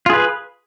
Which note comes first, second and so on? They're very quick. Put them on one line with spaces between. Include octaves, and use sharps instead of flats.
F4 G#4 B4